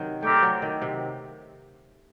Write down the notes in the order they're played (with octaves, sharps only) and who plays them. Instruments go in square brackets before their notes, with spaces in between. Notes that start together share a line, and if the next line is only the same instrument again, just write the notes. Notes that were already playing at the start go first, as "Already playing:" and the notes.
Already playing: [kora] C3 D#3 F#3
[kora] A3 [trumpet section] C4 G4 A#4 D5 G5
[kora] F#3
D#3
C3